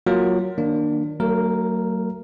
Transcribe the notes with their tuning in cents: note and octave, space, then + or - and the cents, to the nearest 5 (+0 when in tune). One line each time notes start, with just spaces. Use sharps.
F#3 +0 A#3 +0 F4 +0
D#3 -15 A#3 +0 D4 +20
F#3 +20 A3 +45 A#4 +0